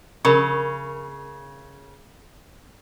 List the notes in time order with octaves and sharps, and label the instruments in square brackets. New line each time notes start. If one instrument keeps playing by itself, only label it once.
[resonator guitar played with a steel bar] C#3 [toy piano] A#4 B5 C#6